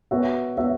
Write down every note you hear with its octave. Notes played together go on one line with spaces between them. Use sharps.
B3 F#4 C#5 E5
B3 F#4 C#5 E5